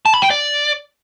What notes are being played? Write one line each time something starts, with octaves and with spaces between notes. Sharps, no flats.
A5
B5
G5
D5